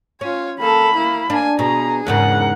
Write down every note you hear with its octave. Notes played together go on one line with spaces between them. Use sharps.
C#4 F4 C#5
A#3 A4 B5
A#3 E4
A#3 D4 G#5
B2 G#4 A#5
E2 G#2 C#3 A#4 F#5